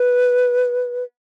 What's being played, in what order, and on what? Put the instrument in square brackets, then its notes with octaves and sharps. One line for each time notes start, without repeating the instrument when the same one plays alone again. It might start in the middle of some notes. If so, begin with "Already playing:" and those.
Already playing: [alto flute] B4